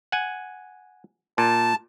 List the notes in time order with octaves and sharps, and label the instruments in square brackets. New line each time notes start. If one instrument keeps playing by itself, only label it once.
[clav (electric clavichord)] F#5 G#5
[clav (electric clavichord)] A#2 [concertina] A5